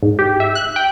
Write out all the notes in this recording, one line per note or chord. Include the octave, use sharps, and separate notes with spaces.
G#2
G4
E5
F#6
G5